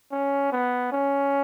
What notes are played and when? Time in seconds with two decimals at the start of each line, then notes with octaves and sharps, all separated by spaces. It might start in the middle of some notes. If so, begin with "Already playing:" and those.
0.12 C#4
0.52 B3
0.92 C#4